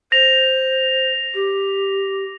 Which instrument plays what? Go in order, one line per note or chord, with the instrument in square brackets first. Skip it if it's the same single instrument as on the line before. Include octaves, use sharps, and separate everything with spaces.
[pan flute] C5 [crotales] A#6 F7
[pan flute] G4